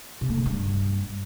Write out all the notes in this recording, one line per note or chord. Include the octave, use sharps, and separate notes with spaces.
C3
A3
C#3
G2